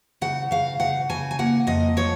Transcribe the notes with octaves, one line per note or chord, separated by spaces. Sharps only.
C#3 F#5
C#3 F5
C#3 F#5
C#3 G#5
G#5
A#3 F#5
F2 D#5
F3 C#5